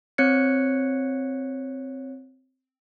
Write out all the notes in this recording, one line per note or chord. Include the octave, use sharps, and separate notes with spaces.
C4 C#5 F#6 G#6 C#7